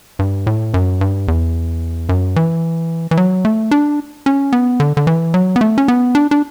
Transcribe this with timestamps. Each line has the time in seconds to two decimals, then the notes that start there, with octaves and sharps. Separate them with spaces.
0.19 G2
0.47 A2
0.74 F#2
1.01 G2
1.28 E2
2.09 F#2
2.36 E3
3.11 E3
3.17 F#3
3.45 A3
3.71 D4
4.26 C#4
4.53 B3
4.80 D3
4.97 D3
5.07 E3
5.34 F#3
5.56 B3
5.61 A3
5.78 C#4
5.88 B3
6.15 D4
6.31 D4